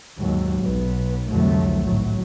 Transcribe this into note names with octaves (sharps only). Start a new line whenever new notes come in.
D#2 G#2 F#3
B1 B3
C2 F2 D3 F#3 A3
G#1 A2 F#3